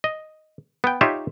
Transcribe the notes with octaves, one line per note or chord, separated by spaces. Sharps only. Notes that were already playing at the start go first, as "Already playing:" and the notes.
D#5
B3 G5
D#4 F4 G4 C#5 E5